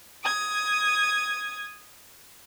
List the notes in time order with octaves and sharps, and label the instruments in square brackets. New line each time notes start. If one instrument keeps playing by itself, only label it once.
[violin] D#6 G#6